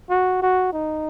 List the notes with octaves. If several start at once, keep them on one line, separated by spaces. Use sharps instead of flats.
F#4
F#4
D#4